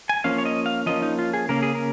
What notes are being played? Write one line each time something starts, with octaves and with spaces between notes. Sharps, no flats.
G#5
F3 A#3 C#4 F5
C#5
D#5
F5
F3 A#3 C#4 D#5
D#4
F4
G#4
C#3 A#3 C#4 A#4
G#4
A#4